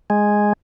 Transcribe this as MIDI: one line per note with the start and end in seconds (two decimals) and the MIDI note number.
0.10 0.53 56